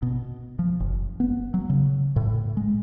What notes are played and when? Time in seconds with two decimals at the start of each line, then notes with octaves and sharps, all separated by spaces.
0.02 B2
0.59 F3
0.80 F#1
1.20 B3
1.54 F#3
1.70 C#3
2.16 A2
2.57 G#3